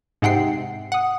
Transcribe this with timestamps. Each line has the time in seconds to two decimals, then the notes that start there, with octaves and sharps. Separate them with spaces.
0.22 G#2 C3 F#5 G5 C7
0.92 F#5 D#6